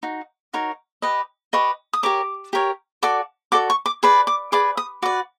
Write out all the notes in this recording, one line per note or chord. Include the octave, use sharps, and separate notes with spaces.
D#4 F#4
D#4 F#4 A#4 C#5
G4 B4 D#5
G4 B4 D#5 C#6
D#6
G4 A#4 C#5 D6
G4 A#4 C#5
F#4 A4 D5 D6
F#4 A4 D5 D6
C#6
D6
G#4 B4 D5
D6
G#4 B4 D5 D6
D#6
F#4 B4 D5 D6